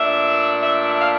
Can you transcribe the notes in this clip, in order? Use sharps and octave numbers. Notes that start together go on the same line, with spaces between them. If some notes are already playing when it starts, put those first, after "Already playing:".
Already playing: A#2 A3 D4 E5
E5
E5
F5